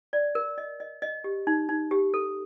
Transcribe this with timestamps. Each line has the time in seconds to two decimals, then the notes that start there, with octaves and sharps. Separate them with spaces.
0.13 D5
0.35 A#4
0.58 D#5
0.80 D#5
1.02 D#5
1.24 G4
1.47 D#4
1.69 D#4
1.91 G4
2.14 A4